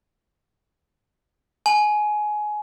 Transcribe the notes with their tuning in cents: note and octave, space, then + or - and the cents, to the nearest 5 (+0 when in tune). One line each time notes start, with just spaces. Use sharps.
G#5 +20